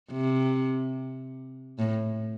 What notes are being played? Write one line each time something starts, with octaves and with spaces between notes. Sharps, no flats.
C3
A2